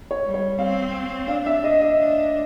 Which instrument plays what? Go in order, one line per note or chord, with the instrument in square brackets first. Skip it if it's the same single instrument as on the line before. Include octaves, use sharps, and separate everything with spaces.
[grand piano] C#5
[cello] G3
[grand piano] C#5
[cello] C4 [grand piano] F5
[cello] D4 [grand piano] F5
[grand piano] E5
D#5
D#5
[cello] D4